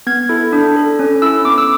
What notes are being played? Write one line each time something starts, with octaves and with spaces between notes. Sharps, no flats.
B3 G#6
E4 A4
D4
A4
C#4
E4 A4 E6
B3 D6
E6